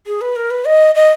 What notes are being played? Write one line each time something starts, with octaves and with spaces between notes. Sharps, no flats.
G#4
B4
A#4
B4
D#5
D#5